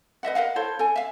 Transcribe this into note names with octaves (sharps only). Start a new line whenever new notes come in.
B4 D#5 E5 F#5
A#4 D#5 F5 F#5
E4 A4 C5 C#5
A4 G#5
E5 F5